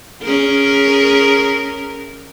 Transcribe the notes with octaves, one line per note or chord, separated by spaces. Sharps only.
C#4 G#4 A#4